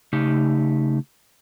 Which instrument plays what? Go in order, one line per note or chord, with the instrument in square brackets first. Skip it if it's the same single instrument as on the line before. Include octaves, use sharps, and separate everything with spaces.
[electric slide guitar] C#3 A3 D#4 G4